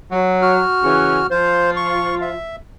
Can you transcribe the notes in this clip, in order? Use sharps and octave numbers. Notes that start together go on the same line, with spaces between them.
F#3
F#4 F6
C#3 E3 C#4
F3 F4 C5
C#6
E5